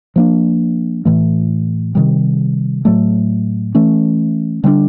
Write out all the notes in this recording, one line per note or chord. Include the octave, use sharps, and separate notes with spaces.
F3 A#3 D4
A2 E3 A3
C3 D#3 G3
A2 F#3 A3
E3 A3 C#4
D3 G3 B3 D4